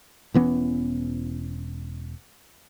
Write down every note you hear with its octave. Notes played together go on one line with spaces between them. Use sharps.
E1 E3 B3 C#4